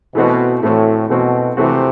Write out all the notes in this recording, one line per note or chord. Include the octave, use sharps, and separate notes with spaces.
B2 E3 A3 C4 F#4
A2 E3 A3 C4 F#4
B2 E3 A3 C4 F#4
C3 E3 A3 C4 F#4